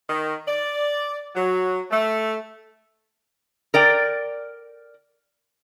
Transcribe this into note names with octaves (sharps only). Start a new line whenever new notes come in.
D#3
D5
F#3
A3
A#4 D5 G5